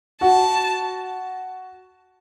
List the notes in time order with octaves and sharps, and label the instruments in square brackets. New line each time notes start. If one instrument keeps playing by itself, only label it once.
[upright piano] F#4 [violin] A5